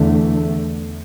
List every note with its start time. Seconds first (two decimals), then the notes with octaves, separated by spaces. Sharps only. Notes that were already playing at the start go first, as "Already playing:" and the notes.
Already playing: E2 D3 A3